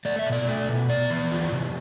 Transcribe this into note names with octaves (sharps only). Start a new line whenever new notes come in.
A3 D5
E5
B2
D5
A3
B2
B3 D5
E3
F4
C3